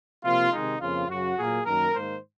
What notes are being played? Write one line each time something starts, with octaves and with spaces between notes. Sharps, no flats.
C3 F3 A#3 F4
C3 D#3 G#3 D#4
F2 C#3 F3 A#3 F4
F#2 C#3 F#3 F#4
A#2 F#3 A#3 G#4
F#2 D#3 A#3 A#4
G#2 D#3 A#3 C5